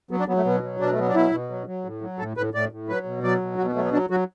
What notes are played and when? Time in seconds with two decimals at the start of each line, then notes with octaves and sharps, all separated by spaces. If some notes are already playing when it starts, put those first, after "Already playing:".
0.11 F#3 B3
0.20 D4
0.28 F#3 B3
0.37 A3
0.45 B2 B3
0.63 F#3
0.80 B2 D4
0.92 A3
0.98 F#3 B3
1.08 D4
1.14 B2 E4
1.32 B2
1.50 F#3
1.67 F#3
1.85 A2
2.01 F#3
2.19 A2 A4
2.37 A2 B4
2.54 A2 D5
2.72 A2
2.89 F#3 B4
3.06 B2
3.23 F#3 D5
3.41 B2
3.58 B2 F#4
3.66 B3
3.75 F#3 A3
3.85 B3
3.93 F#3 D4
4.10 F#3 F#4